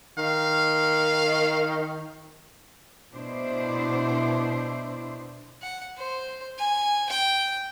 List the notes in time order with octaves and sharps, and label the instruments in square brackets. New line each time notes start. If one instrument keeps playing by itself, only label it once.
[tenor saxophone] D#3 [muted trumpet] F5
[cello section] B2 D4 E4 C5
[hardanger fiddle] F#5
C5
G#5
G5